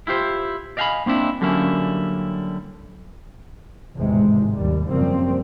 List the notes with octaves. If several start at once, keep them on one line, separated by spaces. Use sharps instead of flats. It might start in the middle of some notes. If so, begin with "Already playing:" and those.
E4 F4 G4 C5
D5 D#5 F5 G5 G#5 B5
A#3 C4 D4 E4
D3 F#3 G3 A#3 C#4 E4
G#1 E2 A2 C3 G#3
D#2 G3
F#2 C#3 F3 G3 A#3 C4